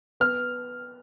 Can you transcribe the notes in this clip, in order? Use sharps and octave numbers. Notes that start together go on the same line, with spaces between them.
B3 F6